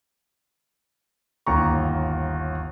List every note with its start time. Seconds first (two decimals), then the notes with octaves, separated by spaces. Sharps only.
1.47 G1 D#2 A#5 C#6